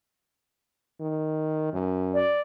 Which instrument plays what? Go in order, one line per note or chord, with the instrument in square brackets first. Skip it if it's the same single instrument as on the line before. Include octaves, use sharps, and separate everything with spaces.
[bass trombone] D#3
F#2
[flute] D5